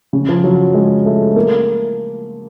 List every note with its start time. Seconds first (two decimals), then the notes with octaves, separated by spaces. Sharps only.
0.13 C#3
0.29 F3
0.44 F#3
0.74 G#3
1.05 A3
1.36 A#3